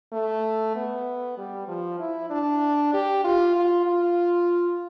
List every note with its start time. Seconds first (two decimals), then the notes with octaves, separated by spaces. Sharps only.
0.13 A3
0.76 B3
1.38 G3
1.68 F3
1.99 E4
2.30 D4
2.94 G4
3.24 F4
3.56 F4
3.86 F4